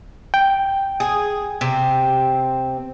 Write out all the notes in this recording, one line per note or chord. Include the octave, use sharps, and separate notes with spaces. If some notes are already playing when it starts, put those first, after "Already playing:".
G5
G#4
C3 C4